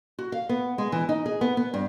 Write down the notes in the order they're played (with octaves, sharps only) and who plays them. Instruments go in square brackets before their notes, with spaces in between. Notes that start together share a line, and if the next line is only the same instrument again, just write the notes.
[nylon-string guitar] F#4
F5
B3
G#3
E3
D#4
G#4
B3
B3
G2